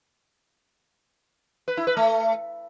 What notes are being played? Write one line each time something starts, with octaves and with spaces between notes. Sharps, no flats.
B4
E4
B4
A3